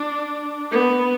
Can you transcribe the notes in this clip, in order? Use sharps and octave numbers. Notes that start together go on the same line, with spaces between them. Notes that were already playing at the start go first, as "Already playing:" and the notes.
Already playing: D4
B3